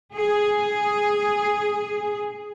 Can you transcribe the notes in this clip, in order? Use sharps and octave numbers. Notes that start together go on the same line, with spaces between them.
G#4